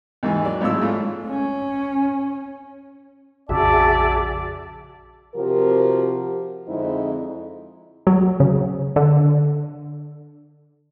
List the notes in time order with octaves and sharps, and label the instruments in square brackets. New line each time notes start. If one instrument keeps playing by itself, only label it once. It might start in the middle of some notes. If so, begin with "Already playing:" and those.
[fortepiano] D#2 G#2 E3
F#3 D5
G#1 A2 F4 G#4 C#5 E6
G#2 A3 F4
[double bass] C#4
[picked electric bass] A#1 F2 C#3 [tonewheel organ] F#4 G#4 E5 [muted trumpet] D5 [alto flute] A5
[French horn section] C3 F3 F#4 G4 A#4
F2 D3 G#3 C4 D#4 E4
[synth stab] F#3
C#3
D3